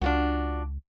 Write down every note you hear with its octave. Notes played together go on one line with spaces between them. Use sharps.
C#2 D4 F4 F#4